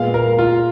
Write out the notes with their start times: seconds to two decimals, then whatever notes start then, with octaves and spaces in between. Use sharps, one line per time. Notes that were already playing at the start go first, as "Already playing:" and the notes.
Already playing: A#2 G#3 B3 F5
0.14 A#4
0.39 F4